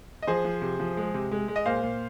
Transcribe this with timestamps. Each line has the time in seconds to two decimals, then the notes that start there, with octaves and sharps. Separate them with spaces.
0.22 D#5
0.27 F3 G#4 C5
0.45 F3
0.62 C3
0.80 F3
0.97 G#3
1.14 C3
1.31 G#3
1.48 G#3
1.56 D#5
1.65 A#2 C5 F5
1.83 A#2